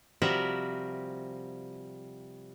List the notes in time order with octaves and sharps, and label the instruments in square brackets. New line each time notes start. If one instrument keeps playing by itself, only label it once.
[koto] C3 F3 G3 F#4 A#4 E5